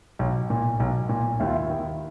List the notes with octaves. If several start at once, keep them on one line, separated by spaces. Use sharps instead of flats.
B1
A#2
B1
A#2
D#2 E4
F4
E4
D#3